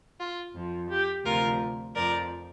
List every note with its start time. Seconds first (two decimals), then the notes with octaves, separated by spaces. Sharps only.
0.20 F4
0.55 F2 F3
0.90 G4
1.25 D2 C3 F3 F4 A#4
1.95 F2 F3 A#4 D5